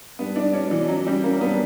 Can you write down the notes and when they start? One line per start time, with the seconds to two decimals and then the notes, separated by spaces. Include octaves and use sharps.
0.19 G2 B3
0.36 D4
0.43 G2
0.53 C#4
0.65 B2
0.71 E3
0.88 F#2 F#3
1.06 F#2 G3
1.23 F#2 A#3
1.41 G2 B3